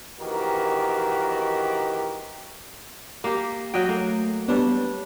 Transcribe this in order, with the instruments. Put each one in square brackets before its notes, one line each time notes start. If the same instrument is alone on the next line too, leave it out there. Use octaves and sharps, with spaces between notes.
[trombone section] A#1 D#3 E3 F#4 G4 A#4
[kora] A#3 G4
F#3 D#5 G5
[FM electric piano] A3 [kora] A#3
[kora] G3 D4 [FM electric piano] B3 B4 C#5